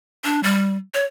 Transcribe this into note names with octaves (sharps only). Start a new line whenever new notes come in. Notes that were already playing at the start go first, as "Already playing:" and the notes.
D4
G3
C#5